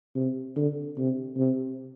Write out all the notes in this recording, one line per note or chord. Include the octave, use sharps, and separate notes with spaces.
C3
D3
C3
C3